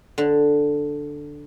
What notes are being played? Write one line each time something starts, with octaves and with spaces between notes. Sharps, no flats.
D3